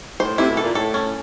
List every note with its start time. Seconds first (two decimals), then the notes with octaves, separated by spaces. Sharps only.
0.20 A2 C5
0.38 C3 E4
0.50 B2
0.57 A4
0.63 A#2
0.75 A2 A4
0.94 C#4